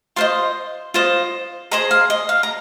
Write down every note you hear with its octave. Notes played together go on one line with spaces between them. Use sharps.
F4 C5 D#5 C6
F4 C5 D#5
G#4 C5 D#5 A#5
F5
D#5
F5
A#5